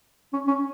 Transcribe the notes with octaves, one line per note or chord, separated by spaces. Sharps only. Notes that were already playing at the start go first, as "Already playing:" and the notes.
C#4
C#4